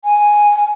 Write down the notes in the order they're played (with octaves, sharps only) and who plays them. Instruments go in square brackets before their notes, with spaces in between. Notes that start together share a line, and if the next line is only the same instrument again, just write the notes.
[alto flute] G#5